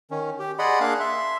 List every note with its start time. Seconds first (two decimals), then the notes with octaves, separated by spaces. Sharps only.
0.11 D#3 C#4
0.39 G4
0.59 G#4 D5 D#5 F#5 B5 C6
0.80 A#3 D4 G#4 F5 F#6
1.00 E5 C6